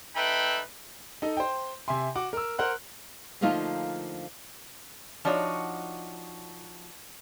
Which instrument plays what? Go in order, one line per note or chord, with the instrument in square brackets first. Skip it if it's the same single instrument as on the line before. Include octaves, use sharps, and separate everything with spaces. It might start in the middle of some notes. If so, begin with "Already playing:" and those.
[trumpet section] A3 D#4 B4 E5 G5 B5
[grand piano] D#4 A4 D#5
C5 G5
C3 E5 G#5 C6
F#4 F#5 D6
A#4 E6
A#4 C5 F#5 F#6
[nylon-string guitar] D3 F3 A3 A#3 D#4 F4
[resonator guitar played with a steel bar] F3 D4 D#4 F#4 C#5